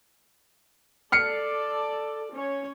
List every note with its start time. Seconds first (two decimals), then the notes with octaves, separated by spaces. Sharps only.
1.12 A4 D5 F6 C7 C#7
2.32 C#4 C#5